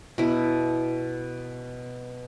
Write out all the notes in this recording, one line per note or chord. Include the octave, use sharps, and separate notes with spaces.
B2 E4